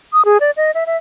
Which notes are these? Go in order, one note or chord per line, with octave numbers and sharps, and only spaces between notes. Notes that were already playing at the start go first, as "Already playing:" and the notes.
D#6
G#4
D5
D#5
E5
E5